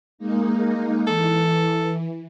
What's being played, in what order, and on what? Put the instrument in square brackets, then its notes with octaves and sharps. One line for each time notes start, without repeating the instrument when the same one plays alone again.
[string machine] G#3 A#3 D#4
[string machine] E3 [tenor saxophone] A4